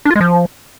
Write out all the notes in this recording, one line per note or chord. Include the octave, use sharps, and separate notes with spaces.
D4
F4
G#3
F3